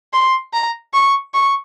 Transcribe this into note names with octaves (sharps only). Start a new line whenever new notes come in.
C6
A#5
C#6
C#6